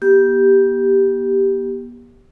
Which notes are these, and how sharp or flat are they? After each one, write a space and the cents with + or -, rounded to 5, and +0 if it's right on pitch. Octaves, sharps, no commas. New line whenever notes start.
B3 -40 G4 +0